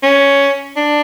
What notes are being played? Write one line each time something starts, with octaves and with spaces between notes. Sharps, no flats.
C#4
D4